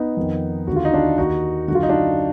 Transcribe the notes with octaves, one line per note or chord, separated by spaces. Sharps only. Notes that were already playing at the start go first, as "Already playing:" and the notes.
Already playing: B3 D#4
F2 D#3
D#2 D3 F#4
F4
D#4
D4 F4
D#2 D#3 D#4 F#4
F#2 D3 F4 F#4
D#4
D4 F4